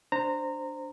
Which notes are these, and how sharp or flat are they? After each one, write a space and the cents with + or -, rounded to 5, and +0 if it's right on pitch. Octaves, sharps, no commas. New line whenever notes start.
D4 +0 C5 +0 A#5 -20